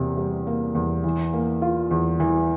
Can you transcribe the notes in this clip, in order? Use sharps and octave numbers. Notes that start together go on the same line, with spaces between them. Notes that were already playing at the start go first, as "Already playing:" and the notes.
Already playing: E2 C3 A#3
G3
A#3
E2
E3
A#3
F4
E2
E3